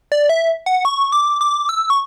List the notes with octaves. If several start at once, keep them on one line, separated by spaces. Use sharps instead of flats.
D5
E5
F#5
C#6
D6
D6
E6
C#6